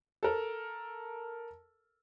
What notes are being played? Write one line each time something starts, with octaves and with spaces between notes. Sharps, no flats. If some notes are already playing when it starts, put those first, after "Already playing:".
A4 A#4